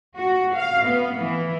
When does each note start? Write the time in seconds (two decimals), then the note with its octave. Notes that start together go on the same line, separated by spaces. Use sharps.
0.17 F#4
0.55 F5
0.85 B3
1.18 E3